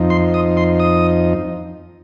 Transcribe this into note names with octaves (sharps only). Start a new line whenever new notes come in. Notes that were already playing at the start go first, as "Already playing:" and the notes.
Already playing: F2 F3 D#4
C6
D#6
C6
D#6